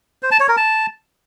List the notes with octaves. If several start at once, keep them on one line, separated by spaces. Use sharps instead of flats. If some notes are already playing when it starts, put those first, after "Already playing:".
C5
A5
C#5
A#4
A5